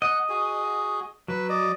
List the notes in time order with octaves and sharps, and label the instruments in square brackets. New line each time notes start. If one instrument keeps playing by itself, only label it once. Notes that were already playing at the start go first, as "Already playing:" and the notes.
[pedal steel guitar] D#5 [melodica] F#5
[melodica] F#4 G#4
[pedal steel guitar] F#3 [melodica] B4
[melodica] D5 D#5